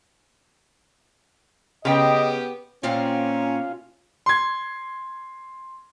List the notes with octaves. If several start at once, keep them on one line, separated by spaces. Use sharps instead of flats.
C#3 B3 G4 D#5 G5
A#2 A#3 C4 C#4 F4
C6 G#6